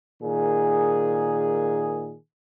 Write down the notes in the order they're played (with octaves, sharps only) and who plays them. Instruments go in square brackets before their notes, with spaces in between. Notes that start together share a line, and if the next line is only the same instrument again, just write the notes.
[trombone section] A#2 D#3 G#4